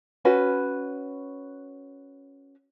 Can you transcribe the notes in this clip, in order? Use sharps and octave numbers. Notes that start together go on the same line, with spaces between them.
C#4 F#4 B4